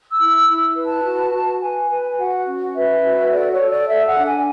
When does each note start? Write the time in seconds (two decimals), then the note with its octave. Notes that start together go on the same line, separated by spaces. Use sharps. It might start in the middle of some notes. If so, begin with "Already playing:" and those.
0.10 E6
0.19 E4
0.29 E6
0.48 E4 E6
0.76 B4
0.86 A5
1.05 F#4
1.33 F#4
1.62 B4 G#5
1.90 B4
2.18 F#4 F#5
2.47 C#4
2.75 B4 E5
3.04 F#4
3.32 A4 D5
3.51 C#5
3.60 A4
3.70 D5
3.89 A4 E5
4.08 F#5
4.17 D4
4.27 G#5